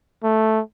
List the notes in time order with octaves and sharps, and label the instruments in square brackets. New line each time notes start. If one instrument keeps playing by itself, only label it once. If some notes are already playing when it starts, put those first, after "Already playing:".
[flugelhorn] A3